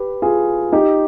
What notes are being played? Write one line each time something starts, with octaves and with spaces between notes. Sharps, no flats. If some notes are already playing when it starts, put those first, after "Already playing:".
Already playing: G4 B4
F4 G#4
D#4 G4